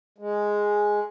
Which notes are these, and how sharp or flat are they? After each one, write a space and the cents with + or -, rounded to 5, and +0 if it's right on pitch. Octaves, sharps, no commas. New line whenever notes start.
G#3 +0